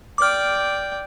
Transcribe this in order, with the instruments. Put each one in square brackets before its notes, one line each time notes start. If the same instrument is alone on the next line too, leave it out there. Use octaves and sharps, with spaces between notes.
[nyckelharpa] D5 G5 [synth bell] D6 F6